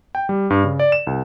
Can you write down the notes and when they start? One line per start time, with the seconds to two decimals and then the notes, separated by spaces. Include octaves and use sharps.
0.15 G5
0.29 G3
0.50 G2
0.64 C#3
0.80 D5
0.92 E7
1.07 C2